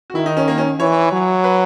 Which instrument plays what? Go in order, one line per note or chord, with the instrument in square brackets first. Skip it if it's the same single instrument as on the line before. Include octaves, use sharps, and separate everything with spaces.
[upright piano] F#4
[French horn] D#3 [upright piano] E4
[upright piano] D#4
C#4
A#3
C#4
[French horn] E3 [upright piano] C#5
[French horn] F#3
[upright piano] B4